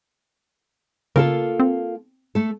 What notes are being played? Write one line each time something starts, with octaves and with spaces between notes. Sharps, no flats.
C#3 A#3 F4 A4 A#4
C4
A3 A4